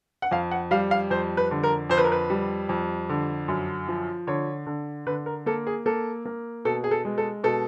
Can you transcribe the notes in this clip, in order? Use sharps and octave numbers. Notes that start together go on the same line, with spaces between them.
F#5
F2 F5
F#5
G3 F5
F5
F2 C5
B4
D3
A#4
F2 C5
B4
A#4
B4
G3
F2
D3
F#2
F3
D3 C#5
D3
D3 B4
A#4
A#3 A4
G#4
A#3 A4
A#3
B2 A4
G#4
A4
G#3
A4
B2 A4